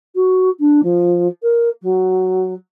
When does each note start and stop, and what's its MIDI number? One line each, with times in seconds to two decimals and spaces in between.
0.15 0.49 66
0.59 0.80 62
0.83 1.27 53
1.42 1.69 70
1.82 2.53 54